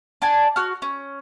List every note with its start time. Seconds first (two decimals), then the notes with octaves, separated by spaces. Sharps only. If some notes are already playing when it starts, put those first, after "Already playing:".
0.22 D4 D5 G#5 A5
0.56 F#4 F6
0.82 C#4